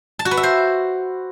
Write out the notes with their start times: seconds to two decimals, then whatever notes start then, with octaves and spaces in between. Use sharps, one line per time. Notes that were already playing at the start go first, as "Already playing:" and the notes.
0.19 A5
0.25 F#4
0.31 B4
0.37 E5
0.43 C5